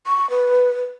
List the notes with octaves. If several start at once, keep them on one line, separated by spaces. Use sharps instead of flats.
C#6
B4